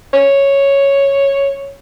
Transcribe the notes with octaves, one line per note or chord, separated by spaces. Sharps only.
C#5